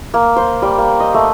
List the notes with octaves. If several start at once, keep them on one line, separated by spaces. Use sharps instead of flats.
A#3
C5
G3
A#3
D#5
A3